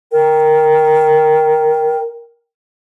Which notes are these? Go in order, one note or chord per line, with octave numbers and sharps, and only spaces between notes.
A#4 G5